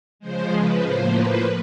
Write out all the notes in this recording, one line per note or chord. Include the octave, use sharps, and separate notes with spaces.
C#3 F3 G#3 C5
B4
A2 F3 A#3 C5
B4